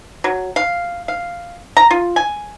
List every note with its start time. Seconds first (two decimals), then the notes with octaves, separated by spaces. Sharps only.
0.24 F#3
0.56 F5
1.08 F5
1.77 A#5
1.91 F4
2.16 G#5